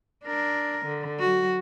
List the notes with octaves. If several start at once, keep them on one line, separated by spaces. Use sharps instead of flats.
D4 A#4
D3
F#3 F#4